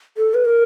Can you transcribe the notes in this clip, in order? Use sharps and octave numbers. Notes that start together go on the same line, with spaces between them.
A4
B4
A#4